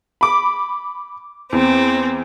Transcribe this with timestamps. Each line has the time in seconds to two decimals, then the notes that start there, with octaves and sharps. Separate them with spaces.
0.21 B5 D6
1.53 E2 C4